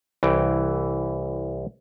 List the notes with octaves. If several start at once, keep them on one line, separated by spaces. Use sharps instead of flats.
C2 E3 G5